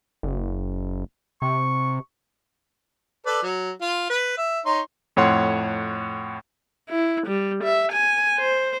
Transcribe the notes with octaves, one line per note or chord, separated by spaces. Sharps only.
F#1
C3 C#6
A4 B4 D5
F#3
F4
B4
E5
D#4 C#5 C6
F2 A2 C#5 F#5 C6
E4
G3
E5
G#5
C5